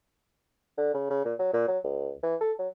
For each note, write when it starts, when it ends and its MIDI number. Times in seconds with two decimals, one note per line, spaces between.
0.78 0.94 50
0.94 1.06 49
1.10 1.23 49
1.25 1.34 46
1.39 1.50 54
1.53 1.68 46
1.68 1.78 54
1.84 2.13 37
2.23 2.36 52
2.41 2.52 69
2.59 2.68 54